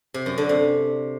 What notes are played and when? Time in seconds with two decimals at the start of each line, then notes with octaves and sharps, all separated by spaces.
0.14 C3
0.26 F#2
0.38 D3
0.49 C3